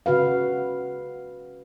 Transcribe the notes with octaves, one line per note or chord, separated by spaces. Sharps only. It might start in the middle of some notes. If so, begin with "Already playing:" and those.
C#3 F#4 B4 F5